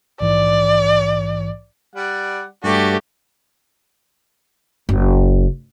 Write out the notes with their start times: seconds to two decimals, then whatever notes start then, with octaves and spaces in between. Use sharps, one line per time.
0.21 A#1 G#2 E3 D5
1.96 G3 D5 F#5
2.64 G2 A3 F#4 G4 D5
4.89 F#1